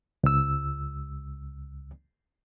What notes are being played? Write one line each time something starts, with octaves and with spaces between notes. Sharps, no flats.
C#2 E6